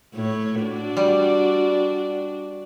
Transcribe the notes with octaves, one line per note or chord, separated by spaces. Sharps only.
A2 C#5
D4 F#4
G3